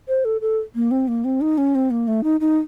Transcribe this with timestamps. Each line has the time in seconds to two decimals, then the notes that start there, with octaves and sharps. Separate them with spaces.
0.08 C5
0.25 A4
0.41 A4
0.75 A#3
0.91 C4
1.08 A#3
1.24 C4
1.41 D#4
1.58 C#4
1.75 C4
1.91 A#3
2.08 A3
2.24 D#4
2.41 D#4